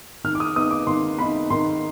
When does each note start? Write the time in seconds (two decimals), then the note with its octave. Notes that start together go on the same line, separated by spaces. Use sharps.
0.24 D#3 F6
0.35 D6
0.40 D#6
0.56 B3 D#4 D#6
0.71 D6
0.87 D#3 C6
1.18 B3 D#4 B5
1.50 D#3 C6